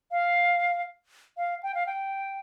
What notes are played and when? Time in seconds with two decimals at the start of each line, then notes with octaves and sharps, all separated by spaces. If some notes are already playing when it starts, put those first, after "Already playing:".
0.11 F5
1.37 F5
1.63 G5
1.75 F5
1.86 G5